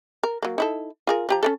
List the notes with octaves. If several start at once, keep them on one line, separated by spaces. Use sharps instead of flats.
A#4
F#3 A#3
D#4 E4 A4
F4 G#4 A#4
F3 G4 A#5
C#4 E4 A4